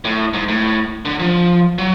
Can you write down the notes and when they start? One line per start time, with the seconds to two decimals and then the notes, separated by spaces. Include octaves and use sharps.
0.05 A2
0.33 G#2
0.48 A2
1.05 D3
1.19 F3
1.78 F#3